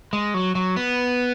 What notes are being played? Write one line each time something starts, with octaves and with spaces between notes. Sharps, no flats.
G#3
F#3
F#3
B3